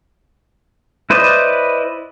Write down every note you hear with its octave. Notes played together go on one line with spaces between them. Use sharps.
E4 B4 C5 D5 D#5